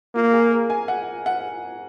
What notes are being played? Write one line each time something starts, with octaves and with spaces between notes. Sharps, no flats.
A#3 F4
G#4
A#4
G#5
F#5
F#5